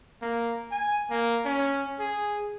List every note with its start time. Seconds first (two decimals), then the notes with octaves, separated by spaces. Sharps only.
0.22 A#3
0.72 G#5
1.10 A#3
1.45 C#4
2.00 G#4